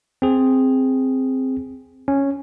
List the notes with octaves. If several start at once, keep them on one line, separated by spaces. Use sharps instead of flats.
C4 G#4
C#4